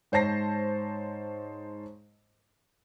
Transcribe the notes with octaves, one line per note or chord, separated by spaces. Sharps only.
G#2 C5 C#5 A5 A#6 C7